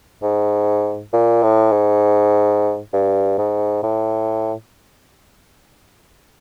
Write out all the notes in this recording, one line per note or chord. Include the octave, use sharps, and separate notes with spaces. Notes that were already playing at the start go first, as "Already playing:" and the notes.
G#2
A#2
A2
G#2
G2
G#2
A2